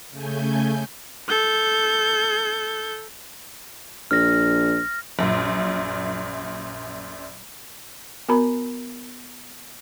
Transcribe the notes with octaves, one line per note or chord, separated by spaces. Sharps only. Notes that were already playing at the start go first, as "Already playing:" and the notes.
C#3 A3 G#5 G6
A4 G6
A#1 F6 A#6
A#1 F#2 A#2
B3 F#4 A#4 A#5 B5